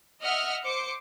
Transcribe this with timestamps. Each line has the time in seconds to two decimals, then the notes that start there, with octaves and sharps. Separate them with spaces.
0.22 D#5 E5 F#5 F6
0.65 C5 D6 C#7